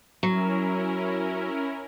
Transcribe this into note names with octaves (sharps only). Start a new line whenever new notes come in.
F#3 C#4 E4 A#4